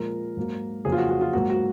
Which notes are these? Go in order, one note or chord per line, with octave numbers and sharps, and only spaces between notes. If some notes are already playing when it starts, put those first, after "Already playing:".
Already playing: A#2 F3 G#3 A#4
G#2 F#3 A#3
F2 C#3 F#3 A#3 G#4
F4
F#4
F#4
F4
G#2 F#3 A#3 F#4
F#4